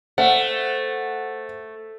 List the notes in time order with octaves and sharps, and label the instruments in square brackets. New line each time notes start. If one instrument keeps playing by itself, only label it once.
[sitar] A3 [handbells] C5 [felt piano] F#5